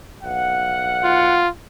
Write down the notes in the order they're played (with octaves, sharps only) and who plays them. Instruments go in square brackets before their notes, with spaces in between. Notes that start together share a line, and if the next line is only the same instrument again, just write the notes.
[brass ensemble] B1 F5 F#5
[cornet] F4